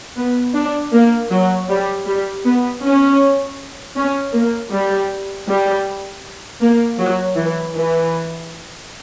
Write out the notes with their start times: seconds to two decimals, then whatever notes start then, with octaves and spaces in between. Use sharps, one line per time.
0.16 B3
0.54 D4
0.93 A#3
1.31 F#3
1.69 G3
2.06 G3
2.45 B3
2.83 C#4
3.96 C#4
4.34 A#3
4.72 G3
5.48 G3
6.61 A#3
6.98 F#3
7.36 E3
7.75 E3